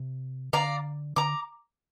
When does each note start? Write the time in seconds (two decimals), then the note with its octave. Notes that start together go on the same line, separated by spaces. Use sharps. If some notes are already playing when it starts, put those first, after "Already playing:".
Already playing: C3
0.53 D3 D5 F5 A#5
1.16 D3 A#5 D6